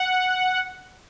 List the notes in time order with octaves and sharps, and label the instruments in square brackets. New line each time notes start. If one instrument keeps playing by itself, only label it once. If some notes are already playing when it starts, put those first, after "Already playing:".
Already playing: [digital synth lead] F#5